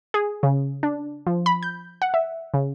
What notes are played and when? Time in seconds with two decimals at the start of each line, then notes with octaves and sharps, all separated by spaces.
0.14 G#4
0.43 C#3
0.83 D4
1.27 F3
1.46 B5
1.63 G6
2.02 F#5
2.14 E5
2.54 C#3